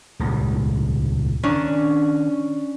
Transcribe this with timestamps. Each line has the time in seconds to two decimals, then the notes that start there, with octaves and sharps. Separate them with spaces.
0.19 D#1 C#2 G#2
1.43 D#3 C#4 D4